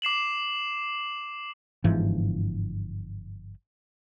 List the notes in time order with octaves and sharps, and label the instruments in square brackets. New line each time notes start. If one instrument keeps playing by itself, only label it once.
[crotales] D6 C7 E7 F#7
[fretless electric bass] G1 G#2 E3 F3